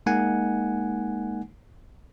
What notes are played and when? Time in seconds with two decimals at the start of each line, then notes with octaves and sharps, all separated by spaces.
0.06 G#3 A#3 D#4 F#5 G#5